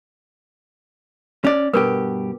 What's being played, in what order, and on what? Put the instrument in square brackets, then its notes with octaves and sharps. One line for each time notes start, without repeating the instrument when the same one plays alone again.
[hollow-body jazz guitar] C#4 D5
[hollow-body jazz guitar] G2 B2 G4 [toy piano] A#4 B4